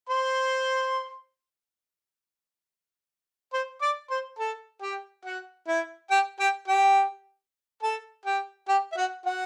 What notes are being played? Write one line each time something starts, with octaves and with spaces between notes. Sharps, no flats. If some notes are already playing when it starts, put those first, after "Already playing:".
C5 C6
C5 C6
D5 D6
C5 C6
A4 A5
G4 G5
F#4 F#5
E4 E5
G4 G5
G4 G5
G4 G5
A4 A5
G4 G5
G4 G5
E5
F#4 F#5
F#4 F#5